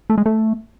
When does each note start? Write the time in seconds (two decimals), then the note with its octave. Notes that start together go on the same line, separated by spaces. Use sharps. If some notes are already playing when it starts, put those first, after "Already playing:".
0.10 A3
0.18 G#3
0.26 A3